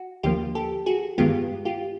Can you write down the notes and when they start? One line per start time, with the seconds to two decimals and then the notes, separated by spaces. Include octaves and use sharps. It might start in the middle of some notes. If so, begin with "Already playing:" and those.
Already playing: F#4
0.23 D#2 D3 F3 A#3 F4 G4
0.55 G4 A4
0.86 F#4 G#4
1.18 G2 D#3 G#3 B3 F4 G4
1.65 F4 G4